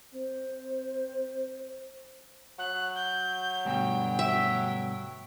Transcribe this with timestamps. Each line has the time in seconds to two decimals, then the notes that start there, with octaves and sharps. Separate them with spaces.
0.14 C4 C5
2.59 F#3 F#6
2.95 G6
3.65 D2 G2 B2 G5
4.19 E5